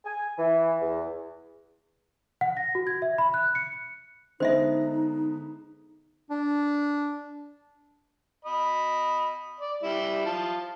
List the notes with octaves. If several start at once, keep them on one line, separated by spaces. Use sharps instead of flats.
G#5
E3
E2
F#5
A#6
F#4
G#6
E5
B5
F#6
C#7
D3 G#3 B3 D#4 C5 D#5 E5
D4
D#5 B5
D5
G3 E4
F4 A5